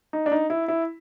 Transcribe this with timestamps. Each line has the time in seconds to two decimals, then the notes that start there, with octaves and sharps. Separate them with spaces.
0.13 D#4
0.26 D4
0.32 D#4
0.50 E4
0.68 E4